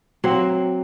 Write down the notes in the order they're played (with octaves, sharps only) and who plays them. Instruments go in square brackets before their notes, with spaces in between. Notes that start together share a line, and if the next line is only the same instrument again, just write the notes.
[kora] F#3 A#3 C4